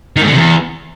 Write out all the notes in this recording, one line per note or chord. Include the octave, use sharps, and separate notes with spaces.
D#3
G#2
D3
C3
E2